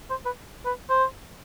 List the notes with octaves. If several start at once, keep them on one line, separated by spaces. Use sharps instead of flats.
C5
B4
B4
C5